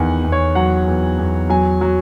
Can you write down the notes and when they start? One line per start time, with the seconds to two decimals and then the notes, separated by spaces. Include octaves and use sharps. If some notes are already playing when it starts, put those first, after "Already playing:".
Already playing: E2 D#3 F#5 G#5
0.24 E2
0.32 C#5
0.55 F#3 F#5
0.88 E2
1.18 E2
1.49 F#3 G#5
1.81 F#3